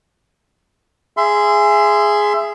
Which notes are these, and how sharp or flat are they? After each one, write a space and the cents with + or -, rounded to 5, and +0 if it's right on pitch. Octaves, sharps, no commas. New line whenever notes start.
G#4 +0 E5 +20 C6 -20